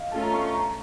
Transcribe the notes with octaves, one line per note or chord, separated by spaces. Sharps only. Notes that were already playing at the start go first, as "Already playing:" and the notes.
Already playing: D#5 F5
A3 C#4 F4 A5
A#5
C#6
C#6
A#5